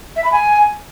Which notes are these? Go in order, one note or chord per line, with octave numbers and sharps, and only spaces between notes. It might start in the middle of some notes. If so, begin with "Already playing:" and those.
E5
B5
G#5